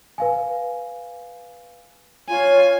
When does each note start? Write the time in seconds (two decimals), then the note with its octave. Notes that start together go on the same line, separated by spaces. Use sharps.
0.18 B4 F5 G#5
2.29 F4 C#5 G#5